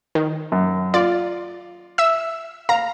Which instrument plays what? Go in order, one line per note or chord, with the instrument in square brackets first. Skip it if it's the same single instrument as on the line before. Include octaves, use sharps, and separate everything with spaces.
[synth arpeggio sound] D#3
[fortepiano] F#2
[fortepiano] F4 [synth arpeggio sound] D5
[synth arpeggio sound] E5 E6
[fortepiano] F5 [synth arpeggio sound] A#5